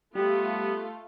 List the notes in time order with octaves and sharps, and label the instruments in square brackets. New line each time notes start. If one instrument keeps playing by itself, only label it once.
[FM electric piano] G3 G4 [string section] A3 F4 [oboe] B3